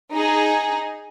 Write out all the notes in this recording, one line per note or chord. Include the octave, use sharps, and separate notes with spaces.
D#4 G#4